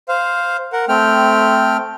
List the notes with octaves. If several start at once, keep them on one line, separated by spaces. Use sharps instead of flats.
C5 F5
A#4 F#5
A3 C4 G5 F6